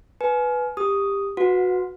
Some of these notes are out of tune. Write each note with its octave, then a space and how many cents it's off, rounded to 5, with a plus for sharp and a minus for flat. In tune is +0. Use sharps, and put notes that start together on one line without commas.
B4 +0 G#5 +30
G4 +20 D#6 +0
F#4 -15 B4 +0 F#5 -35